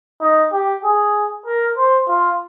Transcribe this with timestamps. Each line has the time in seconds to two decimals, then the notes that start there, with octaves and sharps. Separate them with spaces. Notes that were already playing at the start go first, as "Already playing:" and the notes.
0.21 D#4
0.52 G4
0.84 G#4
1.46 A#4
1.77 C5
2.08 F4